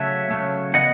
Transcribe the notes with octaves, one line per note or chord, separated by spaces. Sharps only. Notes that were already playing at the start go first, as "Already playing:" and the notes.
Already playing: C#3 F#3 A3 C#5 E5
C#3 F#3 A3
E3 B3 D#5 F#5